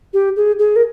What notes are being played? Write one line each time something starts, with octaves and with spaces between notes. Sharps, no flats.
G4
G#4
G#4
A#4